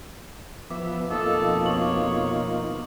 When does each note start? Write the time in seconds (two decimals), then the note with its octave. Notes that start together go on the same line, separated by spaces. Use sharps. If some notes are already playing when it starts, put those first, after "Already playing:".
0.70 F3 B3 E5 D6
1.11 F2 B2 A#3 D#4 F4 A4 D6 D#6
1.66 C#5 D6 D#6 F#7